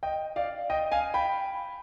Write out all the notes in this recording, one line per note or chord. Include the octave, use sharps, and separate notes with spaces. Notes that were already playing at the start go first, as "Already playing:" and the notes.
D#5 G5
D5 F5
D#5 G5
F5 G#5
G5 B5